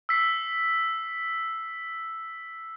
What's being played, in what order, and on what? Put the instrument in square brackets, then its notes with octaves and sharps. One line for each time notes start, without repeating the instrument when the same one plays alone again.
[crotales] E6 B6 C7